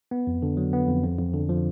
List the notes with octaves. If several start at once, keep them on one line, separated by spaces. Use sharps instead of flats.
B3
F2
D3
F#3
B3
F2
F2
F2
D3
F3